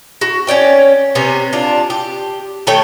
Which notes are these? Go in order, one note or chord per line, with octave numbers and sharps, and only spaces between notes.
F#4
C#4 C#5 D5 G5
C3 B3 C#4
D4 F4
G4
D#3 A3 C#5 G5